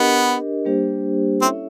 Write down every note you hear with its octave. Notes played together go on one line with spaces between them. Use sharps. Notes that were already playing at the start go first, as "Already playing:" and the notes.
Already playing: B3 D4 G4 A#4 D#5
G3 A#3 D4 G4 C5
C4 C#4 E4 A4 C#5 E5